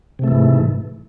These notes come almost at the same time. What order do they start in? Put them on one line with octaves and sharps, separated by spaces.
C3 A3 E3 G#2